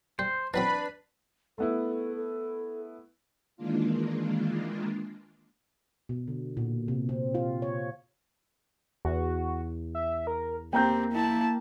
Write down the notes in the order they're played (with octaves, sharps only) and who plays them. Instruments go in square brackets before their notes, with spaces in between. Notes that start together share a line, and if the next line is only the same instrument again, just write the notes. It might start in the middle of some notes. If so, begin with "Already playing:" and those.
[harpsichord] G3 [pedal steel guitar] C5
[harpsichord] E3 F#3 C4 [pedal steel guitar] D4 [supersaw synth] B4 B5
[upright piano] A3 B3 E4 [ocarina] A4
[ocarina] A4
[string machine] D#3 E3 G#3 A#3 D4 F4
[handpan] B2
D3
A#2
C3
C4
F4
C#5
[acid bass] E2 [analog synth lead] F#4
[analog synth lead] E5
A#4
[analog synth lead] A#3 [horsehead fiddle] C4 G4 [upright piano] G5 A#5 G6
[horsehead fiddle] E4 A5